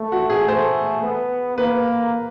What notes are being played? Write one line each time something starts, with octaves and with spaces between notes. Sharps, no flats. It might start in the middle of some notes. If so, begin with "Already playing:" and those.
Already playing: A3
F#4
G#4
A3 C5
B3
A#3 B4